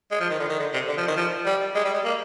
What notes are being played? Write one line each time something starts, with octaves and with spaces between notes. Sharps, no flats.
G#3
F3
D#3
D3
D#3
D3
C3
D3
F3
D#3
F3
G3
G#3
G3
G#3
A#3